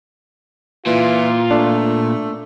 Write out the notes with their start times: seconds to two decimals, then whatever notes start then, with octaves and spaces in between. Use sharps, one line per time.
0.86 A#2 E3 F4
1.51 A3 D4